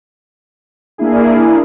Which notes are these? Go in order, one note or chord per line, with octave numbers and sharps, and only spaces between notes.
A#3 D4 E4 G#4